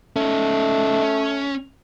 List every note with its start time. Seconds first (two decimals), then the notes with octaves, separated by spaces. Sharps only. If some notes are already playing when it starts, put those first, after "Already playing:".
0.16 A3 C#4 D#4
1.03 C#4